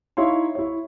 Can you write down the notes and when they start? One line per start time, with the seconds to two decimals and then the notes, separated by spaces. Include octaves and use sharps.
0.17 D#4 E4 C#5 F5 C6
0.55 E4 C#5